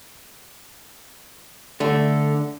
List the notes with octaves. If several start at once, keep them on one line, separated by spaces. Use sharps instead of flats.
D3 A3